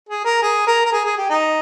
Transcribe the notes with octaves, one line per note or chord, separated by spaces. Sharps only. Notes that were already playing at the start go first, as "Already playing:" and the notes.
G#4
A#4
G#4
A#4
A#4
G#4
G#4
G4
D#4